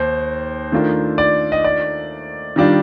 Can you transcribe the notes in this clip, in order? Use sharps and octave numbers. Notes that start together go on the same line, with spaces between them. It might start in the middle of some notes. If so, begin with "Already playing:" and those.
Already playing: D#2 C5
D#3 A3 D4 F4 A#4
D5
D#5
D5
D#3 G3 D4 F4